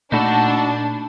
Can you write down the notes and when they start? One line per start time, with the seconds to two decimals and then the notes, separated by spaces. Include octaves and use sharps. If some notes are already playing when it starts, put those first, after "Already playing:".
0.12 A#2 A3 D4 D#4 F#4 A4 B5